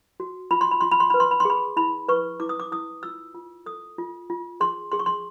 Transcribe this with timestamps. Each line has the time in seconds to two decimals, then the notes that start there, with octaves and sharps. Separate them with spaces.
0.20 F#4
0.51 F4 B5
0.61 C6
0.71 B5
0.81 F4 C6
0.91 B5
1.00 C6
1.10 B4 B5
1.20 C6
1.31 B5
1.40 C6
1.45 G#4 B5
1.77 E4 B5
2.08 B4 C#6
2.40 E4 D6
2.49 D#6
2.60 D6
2.72 E4 D#6
3.03 F4 E6
3.35 F4
3.66 A4 D#6
3.98 F4
4.30 F4
4.60 G#4 C6
4.92 G#4 C6
4.99 C#6
5.06 C6